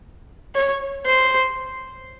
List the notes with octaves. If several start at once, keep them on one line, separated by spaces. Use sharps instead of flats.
C#5
C5